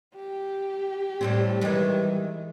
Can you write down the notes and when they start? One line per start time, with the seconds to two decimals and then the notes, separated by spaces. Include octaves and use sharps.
0.16 G4
1.21 A2 G3 C4
1.61 D#3 E3 G3 G#3